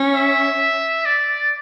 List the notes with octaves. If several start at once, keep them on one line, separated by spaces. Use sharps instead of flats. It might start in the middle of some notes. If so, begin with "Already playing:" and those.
Already playing: C#4
E5
D5